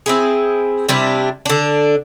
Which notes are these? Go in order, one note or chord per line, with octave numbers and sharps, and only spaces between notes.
C4 E4 G#4
C3 G3 D4 E4
D3 D4